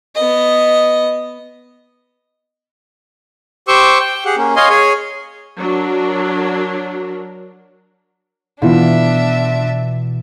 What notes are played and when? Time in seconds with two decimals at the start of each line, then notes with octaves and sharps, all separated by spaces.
0.15 B3 D#5
3.68 G4 C5 G5 C#6 D6 E6
4.00 G5
4.25 G4 G#4 F#5
4.37 A#3 C#4
4.56 C#5 D#5 F5 G#5 C6
4.70 G#4 C#5 G#5
5.59 F#3 D4 A#4
8.62 B2 E3 B3 D4 E4 F4 E5